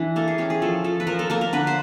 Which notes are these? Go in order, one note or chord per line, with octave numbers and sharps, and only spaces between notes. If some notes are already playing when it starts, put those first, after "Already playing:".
Already playing: E3 D4
A#3 A4
G#4
C#4 G4
G#4
F3 A4
F3 A4
B4
F3 A#4
A4
A#3 A4
A#4
D3 B4
C5